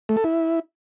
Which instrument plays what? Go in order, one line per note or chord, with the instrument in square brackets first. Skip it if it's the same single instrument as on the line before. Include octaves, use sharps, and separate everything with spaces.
[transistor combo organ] A3
A4
E4